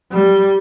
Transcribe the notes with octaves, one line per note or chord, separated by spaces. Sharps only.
G3